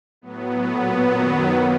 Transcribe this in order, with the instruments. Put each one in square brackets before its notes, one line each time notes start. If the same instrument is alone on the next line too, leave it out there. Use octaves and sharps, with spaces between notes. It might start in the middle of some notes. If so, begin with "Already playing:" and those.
[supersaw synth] A2 F#3 B3
A#2 F#3
F#2 D#3 F#3
A#3